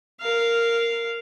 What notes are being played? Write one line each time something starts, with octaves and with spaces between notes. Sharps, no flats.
A#4 F5